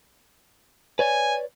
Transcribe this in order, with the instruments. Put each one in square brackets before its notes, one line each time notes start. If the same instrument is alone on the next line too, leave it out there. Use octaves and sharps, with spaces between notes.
[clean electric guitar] B4 C#5 D5 [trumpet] G#5